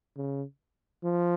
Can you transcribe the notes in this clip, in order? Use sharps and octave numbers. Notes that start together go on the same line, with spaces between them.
C#3
F3